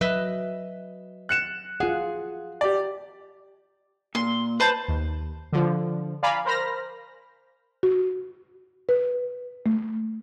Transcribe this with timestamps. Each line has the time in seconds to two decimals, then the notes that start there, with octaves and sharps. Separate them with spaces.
0.01 F#3 B4 D#5 E5
1.29 F#6 C#7 E7
1.80 F4 G#4 F#5
2.61 G4 D5
4.15 A#2 C6
4.60 B4 C5 A5 G6
4.88 D#2
5.53 D3 F3
6.23 D5 F5 G#5 A#5 B5
6.45 A#4 C5 B5 F6 A#6
7.83 F#4
8.89 B4
9.66 A3